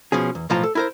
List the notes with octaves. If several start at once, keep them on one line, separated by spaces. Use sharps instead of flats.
B2 F3 C#4 G#4
E2
B1 A2 F3 F4 A5 A#5
A4
E4 A#4 C5